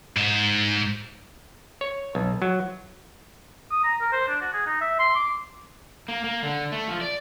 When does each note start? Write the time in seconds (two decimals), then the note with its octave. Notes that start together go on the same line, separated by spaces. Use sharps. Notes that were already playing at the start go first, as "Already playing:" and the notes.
0.17 G#2 C5
1.81 C#5
2.15 B1
2.42 F#3
3.72 D#6
3.84 A#5
4.01 A#4
4.13 C5
4.28 D4
4.42 F#4
4.54 G#4
4.67 D#4
4.81 E5
4.99 C6
5.15 D6
6.09 A#3
6.24 A#3
6.43 D3
6.72 A3
6.88 F3
7.01 D5